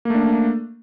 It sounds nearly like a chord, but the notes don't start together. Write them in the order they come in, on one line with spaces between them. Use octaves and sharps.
A#3 A3 D4